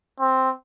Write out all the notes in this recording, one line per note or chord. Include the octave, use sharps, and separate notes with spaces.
C4